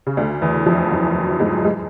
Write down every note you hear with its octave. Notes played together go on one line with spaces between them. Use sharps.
C#3
D2 D3
E2 E3
F2 F3
F#2 F#3
G#2 G#3
G#3